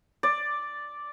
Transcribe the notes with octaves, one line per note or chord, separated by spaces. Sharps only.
D5